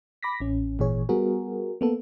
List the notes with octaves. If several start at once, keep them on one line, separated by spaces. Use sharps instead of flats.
B5 D6 A#6 B6
A1 C#4
G#1 A#2 E3 G#4 C#5
G3 B3 F#4 G#4 A#4
A#3 B3 A4